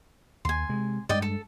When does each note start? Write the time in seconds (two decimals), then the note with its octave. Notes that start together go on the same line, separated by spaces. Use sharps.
0.45 D#2 G#5 C6
0.69 C3 G#3
1.09 G2 G#3 D5 D#5 G5
1.22 A4